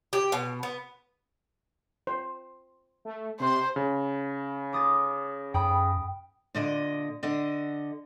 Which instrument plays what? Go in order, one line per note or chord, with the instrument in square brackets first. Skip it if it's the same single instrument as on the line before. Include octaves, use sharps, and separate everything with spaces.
[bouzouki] G4
B2
B3
[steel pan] C5
[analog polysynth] A3
[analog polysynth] C3 C6 [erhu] C5
[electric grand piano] C#3
[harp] D6 D#6 A6
[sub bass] F#2 [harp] G5 B5 D#6
[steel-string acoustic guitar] A#2 D3 D#5
D3 D#5 F#5